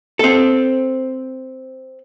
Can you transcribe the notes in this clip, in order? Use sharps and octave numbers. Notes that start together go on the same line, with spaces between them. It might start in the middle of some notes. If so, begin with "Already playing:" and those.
C4 A4